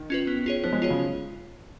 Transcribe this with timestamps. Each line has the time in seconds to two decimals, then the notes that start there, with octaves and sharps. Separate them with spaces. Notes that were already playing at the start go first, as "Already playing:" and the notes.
Already playing: D#3
0.10 C#4 F4 B4
0.27 B3
0.46 F4 G#4 C#5
0.64 F3 B3
0.72 G#3
0.82 F#3 F4 G#4 C#5
0.90 C#3